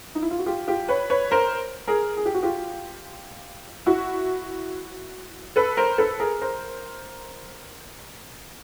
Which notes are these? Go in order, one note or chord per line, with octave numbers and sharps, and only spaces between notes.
D#4
E4
F4
F#4
F4 G4
F4 G4
B4 C#5
B4 C#5
A#4 C5
G#4 A#4
G#4
G4
F#4
F4 G4
E4 F#4
A4 B4
A#4 C5
A4 B4
G#4 A#4
A#4 C5